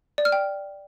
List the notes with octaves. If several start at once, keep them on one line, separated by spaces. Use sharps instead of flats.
D5
F6
G5